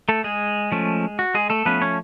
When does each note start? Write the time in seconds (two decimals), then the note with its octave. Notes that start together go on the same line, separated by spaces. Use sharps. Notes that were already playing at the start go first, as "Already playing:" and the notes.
0.09 A3 A4
0.24 G#3 G#4
0.72 F3 A3 C#4
1.19 F#4
1.34 G#3 G#4
1.50 A3 A4
1.65 F3 A3 B3 C#4 B4
1.82 C#4 C#5